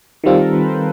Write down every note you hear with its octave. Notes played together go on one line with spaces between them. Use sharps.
D#3 G3 C4 F4 A4
A#4
B4
C5